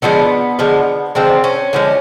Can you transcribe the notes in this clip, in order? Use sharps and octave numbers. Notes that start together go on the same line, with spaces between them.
D3 F3 G#3 B3
D3 F3 G#3
D3 F3 G#3 C4
C#4
D3 F3 G#3